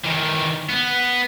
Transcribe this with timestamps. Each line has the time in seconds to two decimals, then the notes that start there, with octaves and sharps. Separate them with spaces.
0.05 D#3 E3
0.69 B3